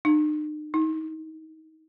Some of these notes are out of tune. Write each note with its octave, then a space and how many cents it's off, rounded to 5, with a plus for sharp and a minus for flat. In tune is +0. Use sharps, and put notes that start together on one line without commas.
D#4 -45
D#4 +30